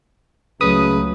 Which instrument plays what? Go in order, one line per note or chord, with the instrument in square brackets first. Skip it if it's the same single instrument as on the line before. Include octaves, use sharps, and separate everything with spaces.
[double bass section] C#2 F#3 A3 [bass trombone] C#3 [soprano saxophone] B4 [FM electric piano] D#6